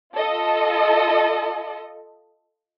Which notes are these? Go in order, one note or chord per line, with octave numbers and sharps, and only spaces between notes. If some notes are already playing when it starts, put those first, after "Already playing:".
F4 A4 D#5